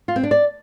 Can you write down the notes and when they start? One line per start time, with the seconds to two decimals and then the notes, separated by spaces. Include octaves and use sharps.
0.08 F4
0.16 C4
0.23 D4
0.31 D5